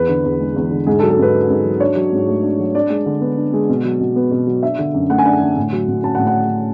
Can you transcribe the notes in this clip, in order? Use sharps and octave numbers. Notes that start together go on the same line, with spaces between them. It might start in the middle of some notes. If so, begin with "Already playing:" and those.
Already playing: E2 B4
D3
E2
G#3
E2
D3
G#2 G#4
A4
F#3
A4
G#2 B4
C#4
G#2
F#3
D4 C#5
F#3
G#2
A3
D4
F#3
D4 D5
G#3
D3
B3
D4
G#3
B2
F#3
B2
B3
B2
F#3
D4 E5
D3
F#2
A3 F#5
G#5
D4 F#5
D3
A2
F#3
A2
C#4 A5
F#5
A2
F#5